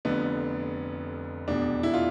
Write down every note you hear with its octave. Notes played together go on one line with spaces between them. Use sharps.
F1 F2 D3 B3
F1 E2 B2 D4
E4
F4